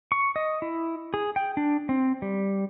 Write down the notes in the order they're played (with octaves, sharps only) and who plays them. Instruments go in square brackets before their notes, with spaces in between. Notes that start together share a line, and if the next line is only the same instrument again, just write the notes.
[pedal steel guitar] C#6
D#5
E4
G#4
G5
D4
C4
G3